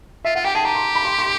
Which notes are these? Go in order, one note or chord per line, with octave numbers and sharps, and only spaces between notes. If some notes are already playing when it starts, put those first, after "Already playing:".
F4 E5
F4 F#5
G4 G5
G#4 A5
G4 A#5
C6
B5
C6
C6